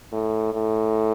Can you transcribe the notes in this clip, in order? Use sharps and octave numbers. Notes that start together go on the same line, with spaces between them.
A2
A2